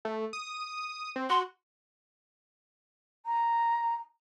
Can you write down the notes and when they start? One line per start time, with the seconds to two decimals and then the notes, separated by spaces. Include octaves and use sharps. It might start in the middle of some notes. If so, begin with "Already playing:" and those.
0.05 A3
0.33 D#6
1.16 C4
1.30 F#4 C6
3.26 A#5